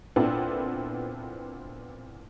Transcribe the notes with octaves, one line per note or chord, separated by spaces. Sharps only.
A#2 B3 C4 D4 E4 A4